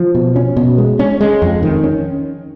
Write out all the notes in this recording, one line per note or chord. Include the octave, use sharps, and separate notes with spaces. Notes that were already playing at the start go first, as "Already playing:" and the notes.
Already playing: F3
B2
C#4
B2
G#3
C#4
G#3
F2
D#3
C#4